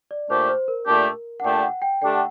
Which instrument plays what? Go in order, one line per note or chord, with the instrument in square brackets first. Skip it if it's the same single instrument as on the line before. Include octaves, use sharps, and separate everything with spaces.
[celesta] D5
[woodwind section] A#2 A3 D4 G4 [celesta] C5
[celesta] C5
A#4
[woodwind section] A#2 A3 D4 G4
[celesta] F#5
[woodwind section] A#2 A3 D4 G4 [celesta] G5
[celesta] F#5
G5
[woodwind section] D3 A3 D4 G4 [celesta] G5
[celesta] F#5